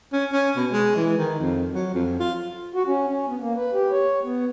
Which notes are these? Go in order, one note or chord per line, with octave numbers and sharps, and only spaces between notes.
C#4
C#4
B2
G#3
E3
D#3
F2
F#3
F2
F4
F#4
C#4
C#4
B3
A#3
B4
G4
C#5
B3